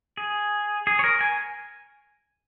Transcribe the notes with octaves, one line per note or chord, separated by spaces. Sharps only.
G#4
G#4
C#5
A#4
G#5